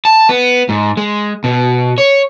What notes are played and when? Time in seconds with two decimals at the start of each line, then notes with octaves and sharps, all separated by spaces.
0.05 A5
0.29 B3
0.69 G#2
0.97 G#3
1.44 B2
1.98 C#5